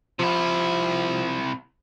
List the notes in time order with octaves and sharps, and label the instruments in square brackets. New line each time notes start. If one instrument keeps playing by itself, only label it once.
[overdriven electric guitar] C3 E4 [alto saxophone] F3